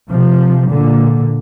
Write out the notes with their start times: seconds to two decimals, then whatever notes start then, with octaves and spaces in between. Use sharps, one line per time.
0.10 C3 F3
0.68 A#2 D3